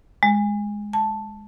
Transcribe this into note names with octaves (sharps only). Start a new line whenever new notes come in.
G#3
A5